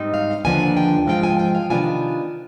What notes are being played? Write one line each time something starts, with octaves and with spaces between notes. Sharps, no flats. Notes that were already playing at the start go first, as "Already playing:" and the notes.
Already playing: G#2 G3 C4 D#4
F5
D#2 D3 F3 B3 D4 G#5
G5
G#2 F3 G#3 C4 F4 G5
G#5
G5
F5
C3 D#3 B3 D4 F4 G#5